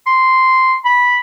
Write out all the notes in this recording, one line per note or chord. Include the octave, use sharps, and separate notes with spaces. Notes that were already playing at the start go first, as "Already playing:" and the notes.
C6
B5